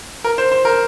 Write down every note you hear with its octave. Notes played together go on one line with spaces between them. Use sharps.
A#4
C5
C5
A#4